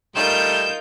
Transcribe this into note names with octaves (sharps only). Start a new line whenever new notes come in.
G3 A3 D#4 F4 A#4 G6 E7